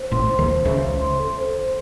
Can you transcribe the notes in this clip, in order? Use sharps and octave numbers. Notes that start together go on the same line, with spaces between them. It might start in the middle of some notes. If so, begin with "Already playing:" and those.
Already playing: C5
A1 A2 C6
C5
D#2 D#3
C5
C#2 C#3 E5
C5
C6
A4
C5
C5